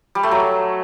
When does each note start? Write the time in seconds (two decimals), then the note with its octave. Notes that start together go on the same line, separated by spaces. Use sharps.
0.15 G3
0.23 A3
0.31 F#3